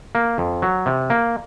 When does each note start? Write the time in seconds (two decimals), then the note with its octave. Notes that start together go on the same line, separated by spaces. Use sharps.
0.15 A#3
0.38 F2
0.62 F#3
0.86 C3
1.10 A#3